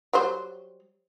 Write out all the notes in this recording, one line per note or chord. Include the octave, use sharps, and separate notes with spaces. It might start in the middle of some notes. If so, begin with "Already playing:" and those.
F#3 G3 C5